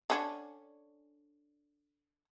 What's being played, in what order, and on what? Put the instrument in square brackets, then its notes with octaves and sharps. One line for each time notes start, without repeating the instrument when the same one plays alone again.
[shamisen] D3 C#4 D4